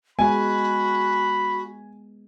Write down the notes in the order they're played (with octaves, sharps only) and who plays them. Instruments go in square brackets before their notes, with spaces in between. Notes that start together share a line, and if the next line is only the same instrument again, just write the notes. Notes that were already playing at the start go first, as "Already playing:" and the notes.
[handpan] G#3 B3 [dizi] F#4 [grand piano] G#5 [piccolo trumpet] B5